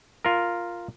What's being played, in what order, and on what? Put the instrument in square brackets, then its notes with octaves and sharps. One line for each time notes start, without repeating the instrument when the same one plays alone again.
[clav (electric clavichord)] F4 A#4